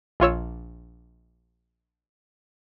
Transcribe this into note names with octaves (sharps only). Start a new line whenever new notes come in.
A#1 F4 C#5 E6